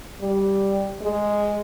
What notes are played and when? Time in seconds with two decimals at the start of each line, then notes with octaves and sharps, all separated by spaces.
0.21 G3
1.02 G#3